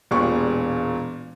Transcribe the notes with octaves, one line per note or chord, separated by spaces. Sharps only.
E1 A#2 G#3 G4 D5 C#6